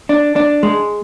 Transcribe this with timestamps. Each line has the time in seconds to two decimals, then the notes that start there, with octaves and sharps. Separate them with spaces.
0.09 D4
0.36 D4
0.63 G#3